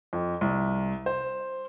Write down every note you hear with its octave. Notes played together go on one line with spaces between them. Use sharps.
F2
C2
C5